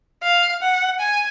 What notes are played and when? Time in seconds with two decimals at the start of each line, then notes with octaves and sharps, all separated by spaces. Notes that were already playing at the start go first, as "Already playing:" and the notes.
0.24 F5
0.62 F#5
1.00 G#5